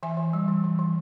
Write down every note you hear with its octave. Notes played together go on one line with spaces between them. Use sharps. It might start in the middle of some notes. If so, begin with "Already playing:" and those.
E3 E5 G#5
E3
G3
E3
E3
E3